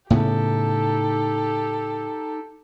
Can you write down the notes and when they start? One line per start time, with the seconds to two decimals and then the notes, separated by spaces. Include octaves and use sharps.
0.10 A2 C#3 B3 D#4 G4 A4